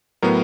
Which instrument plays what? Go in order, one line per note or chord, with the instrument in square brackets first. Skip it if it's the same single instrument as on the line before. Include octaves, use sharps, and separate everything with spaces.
[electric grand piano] A2 F#3 B3 A#4